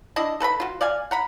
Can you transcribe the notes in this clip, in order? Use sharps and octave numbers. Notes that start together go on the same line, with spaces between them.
D4 E4 D#5
A4 B4 A#5 B5
F4 F#4
D5 F5 G#5
F#5 A#5 B5